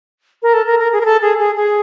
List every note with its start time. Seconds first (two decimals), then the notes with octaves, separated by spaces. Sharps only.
0.42 A#4
0.54 A4
0.67 A#4
0.79 A#4
0.92 G#4
1.01 A#4
1.05 A4
1.22 G#4
1.39 G#4
1.56 G#4